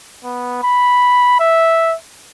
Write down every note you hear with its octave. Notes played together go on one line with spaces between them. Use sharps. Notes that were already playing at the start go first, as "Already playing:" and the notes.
B3
B5
E5